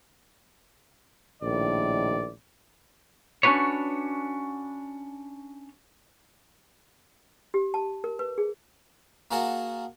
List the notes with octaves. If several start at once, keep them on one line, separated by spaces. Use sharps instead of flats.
A#1 A2 D#3 D5
C#4 D4 F#4 B4 C#5
G4
A5
A#4
B4
G#4
A#3 F#4 G#4 A#4 F#5 A5